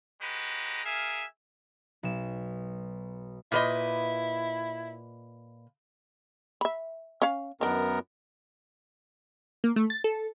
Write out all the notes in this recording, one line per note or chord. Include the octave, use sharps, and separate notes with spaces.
G#3 F#4 G4 B4 A#5
G#4 A#4 E5 F5 G#5
B1 E7
A#2 E4 B4 D#5
E5 B5
C#4 F5
F#2 D#3 B3 D4 A#4
A#3
A3
A6
A4